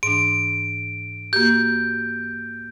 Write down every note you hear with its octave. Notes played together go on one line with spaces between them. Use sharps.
G#2 E3 D4 D7
A#3 F#4 G4 G6